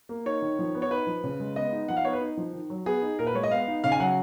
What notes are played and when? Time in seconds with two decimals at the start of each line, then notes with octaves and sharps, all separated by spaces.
0.09 A#3
0.26 D#4 C#5
0.42 D#3
0.59 F3
0.75 B3
0.82 C#5
0.91 D#4 B4
1.07 F3
1.24 C#3
1.40 G#3
1.56 B3 D#5
1.72 D#4
1.88 F3 F#5
1.97 F5
2.05 B3 C#5
2.13 B4
2.21 D#4
2.37 F3
2.53 D#3
2.70 F#3
2.86 B3 G#4
3.02 D#4
3.19 A#2 A#4
3.27 B4
3.35 G#3 C#5
3.43 D#5
3.51 B3 F5
3.68 D#4
3.84 C#3 F5
3.92 G#5
4.00 F#3 F#5